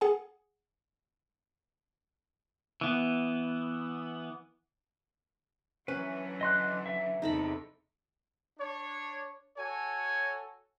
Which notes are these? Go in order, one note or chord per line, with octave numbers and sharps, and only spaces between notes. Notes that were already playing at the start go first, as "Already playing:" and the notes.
G#4 F#5 G#5
E3 B3
D3 E3 F#3 C#4 B4
D#5 C6 F#6
E5
E2 C3 D#4 A4 B5
D4 C#5
F#4 A4 C#5 G#5